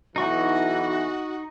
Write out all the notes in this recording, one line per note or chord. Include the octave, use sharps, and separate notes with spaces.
B1 E3 D#4 F#4 C#6